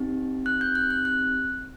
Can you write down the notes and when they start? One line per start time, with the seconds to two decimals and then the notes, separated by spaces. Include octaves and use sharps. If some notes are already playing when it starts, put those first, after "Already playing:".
Already playing: C4 D#4 G4
0.46 F#6
0.61 G6
0.75 F#6
0.90 F#6
1.05 F#6